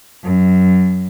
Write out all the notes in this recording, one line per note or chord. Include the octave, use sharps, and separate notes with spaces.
F#2